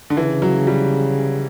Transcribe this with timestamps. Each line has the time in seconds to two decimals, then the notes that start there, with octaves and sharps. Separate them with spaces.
0.10 D3
0.17 C#3 E3
0.42 F#3
0.67 G3